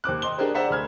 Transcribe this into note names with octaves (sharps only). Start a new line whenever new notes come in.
D#2 C5 D6 F#6
D#5 C6 G7
D4 G4 G#4 A#4 C5 D#5
C5 D5 E5 F#5 A#5
D2 B5 F6 G#6